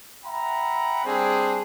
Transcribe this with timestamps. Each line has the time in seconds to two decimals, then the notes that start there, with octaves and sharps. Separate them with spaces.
0.24 E5 F#5 G5 A#5 B5
1.04 G3 C4 D4 G#4